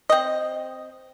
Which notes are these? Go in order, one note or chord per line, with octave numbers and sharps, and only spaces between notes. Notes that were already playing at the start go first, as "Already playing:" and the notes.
C4 D#5